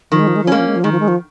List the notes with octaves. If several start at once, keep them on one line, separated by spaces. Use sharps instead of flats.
D#3 F3
G#3
F3
G#3
F3
G#3 A#3 C#4
F3
G#3
F3
D#3 G#3
F3
G#3
F3